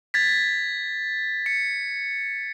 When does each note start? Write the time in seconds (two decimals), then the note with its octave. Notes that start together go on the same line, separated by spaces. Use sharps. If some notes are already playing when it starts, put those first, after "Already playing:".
0.14 G#6 A6 B6
1.46 C#7